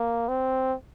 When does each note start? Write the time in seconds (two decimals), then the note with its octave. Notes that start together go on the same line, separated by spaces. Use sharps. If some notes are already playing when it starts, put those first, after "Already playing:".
Already playing: A#3
0.28 C4